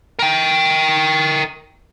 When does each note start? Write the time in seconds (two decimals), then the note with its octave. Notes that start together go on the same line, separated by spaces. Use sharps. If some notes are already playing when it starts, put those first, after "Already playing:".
0.19 A#4 G5